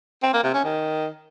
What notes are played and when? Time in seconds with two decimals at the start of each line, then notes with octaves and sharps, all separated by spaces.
0.23 C4
0.33 A#3
0.44 C3
0.54 C#4
0.64 D#3